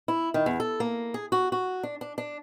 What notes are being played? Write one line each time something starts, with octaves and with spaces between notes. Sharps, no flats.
E4
D#3
E2
A4
A#3
G#4
F#4
F#4
D4
D4
D4